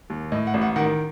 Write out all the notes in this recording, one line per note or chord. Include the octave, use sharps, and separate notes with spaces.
D#2
A2 D#5
F#5
A1
F#5
D#3 F#5